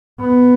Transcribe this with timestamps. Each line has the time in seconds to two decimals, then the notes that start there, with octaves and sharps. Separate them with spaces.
0.21 B3